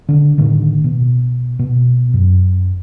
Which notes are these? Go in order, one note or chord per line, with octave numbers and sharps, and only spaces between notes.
D3 D4
A2 D3 D#3
B2
B2
F#2